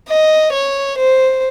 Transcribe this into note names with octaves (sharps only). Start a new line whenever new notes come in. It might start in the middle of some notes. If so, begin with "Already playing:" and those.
D#5
C#5
C5